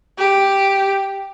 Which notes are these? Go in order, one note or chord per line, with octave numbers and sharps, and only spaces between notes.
G4